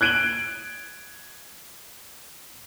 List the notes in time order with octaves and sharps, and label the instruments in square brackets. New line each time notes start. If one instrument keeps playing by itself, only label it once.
[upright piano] F#6 G#6 D7 D#7 F#7 G7